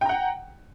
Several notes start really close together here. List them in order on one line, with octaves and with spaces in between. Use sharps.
G5 A#5 F#5